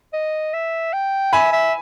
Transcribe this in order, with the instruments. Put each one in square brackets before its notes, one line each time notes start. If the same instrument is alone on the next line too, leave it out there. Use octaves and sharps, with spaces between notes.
[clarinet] D#5
E5
G5
[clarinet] E5 [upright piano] G#5 B5
[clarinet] E5